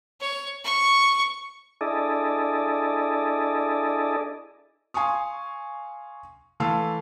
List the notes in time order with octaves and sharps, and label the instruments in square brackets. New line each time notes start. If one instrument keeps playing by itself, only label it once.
[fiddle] C#5
C#6
[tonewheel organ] D4 E4 G#4 A4 D5 D#5
[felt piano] F5 G#5 C6 C#6 D#6
E3 A3 F5 A5 C6 E6